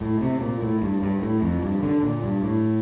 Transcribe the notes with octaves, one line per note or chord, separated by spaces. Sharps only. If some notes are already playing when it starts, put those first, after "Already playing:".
A2
C3
A#2
A2
G2
G2
A2
F2
G2
D3
A#2
G2
A2